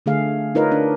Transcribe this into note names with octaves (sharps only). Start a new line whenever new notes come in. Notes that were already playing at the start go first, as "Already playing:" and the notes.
D3 A3 G#4 F5
D#4 F4 A#4 B4 C#5 D#5
D4